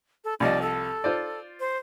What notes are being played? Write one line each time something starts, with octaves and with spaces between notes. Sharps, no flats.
A4
C2 F3 D5 D#5
A4
F4 C5 D5
C5